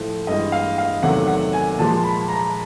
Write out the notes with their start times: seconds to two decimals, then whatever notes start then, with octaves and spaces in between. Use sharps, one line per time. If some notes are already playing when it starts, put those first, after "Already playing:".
Already playing: A2 F3 A3
0.27 G2 E3 G#3 D#5
0.52 F5
0.78 F5
1.03 E2 C3 D#3 F#3 A3 F#5
1.28 F#5
1.53 G#5
1.79 A#2 F3 G#3 A5
2.04 B5
2.29 A#5